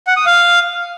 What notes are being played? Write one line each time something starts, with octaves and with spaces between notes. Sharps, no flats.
F#5
D#6
F5